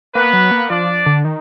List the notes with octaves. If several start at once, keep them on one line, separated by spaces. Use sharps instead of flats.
A#3 B3 B4
F#3
A#3
F3 D4 D5
D3
D#3